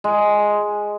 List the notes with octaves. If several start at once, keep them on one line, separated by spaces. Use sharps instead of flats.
G#3